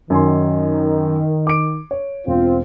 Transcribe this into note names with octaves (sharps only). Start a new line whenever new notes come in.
F#2 D#3 G#5 C6
D6 D7
C#5
E1 C4 F4